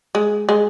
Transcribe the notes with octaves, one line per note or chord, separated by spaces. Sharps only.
G#3
G#3